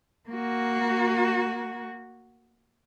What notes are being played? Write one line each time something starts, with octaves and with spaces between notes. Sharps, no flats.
A#3 F#4